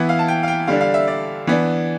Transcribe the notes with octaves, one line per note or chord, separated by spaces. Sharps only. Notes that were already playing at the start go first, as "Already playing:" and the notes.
Already playing: E3 B3 E4
F5
A5
G5
F5
G5
D3 G3 D4 F5
F5
E5
D5
E3 B3 D4